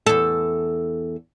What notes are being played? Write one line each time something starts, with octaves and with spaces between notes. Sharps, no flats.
E2 A4